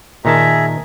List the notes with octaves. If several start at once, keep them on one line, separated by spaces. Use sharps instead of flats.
A#2 D#3 G#4 E5 A5 A#5